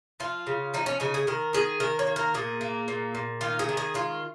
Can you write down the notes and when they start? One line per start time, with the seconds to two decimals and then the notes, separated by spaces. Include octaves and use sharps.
0.20 F3 F4
0.47 C#3
0.74 F3 D#4
0.86 C#4
1.00 C#3 D#4
1.14 G#4
1.27 D#3 A#4
1.53 D#3 G#4
1.80 D#3 A#4
1.99 C#5
2.07 A#3
2.16 A#4
2.34 A#2 G#4
2.61 A#3
2.88 A#2
3.15 A#2
3.41 D#3 F4
3.59 G#4
3.69 D#3
3.77 G#4
3.94 G#3 F4